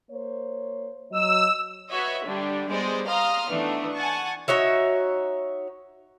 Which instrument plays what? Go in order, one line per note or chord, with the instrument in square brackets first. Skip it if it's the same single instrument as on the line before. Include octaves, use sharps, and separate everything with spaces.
[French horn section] A#3 C5 C#5
[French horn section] F#3 D#5 [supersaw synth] E6
[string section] F#4 B4 C#5 D#5 E5
D3 G3 D4 G4
G3 G#3 B3 C5 D5 D#5
F5 A#5 C6 D#6 F6
E3 A3 B3 D4 D#4
F#5 G#5 A5 C#6
[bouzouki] D#4 F#4 C#5 E5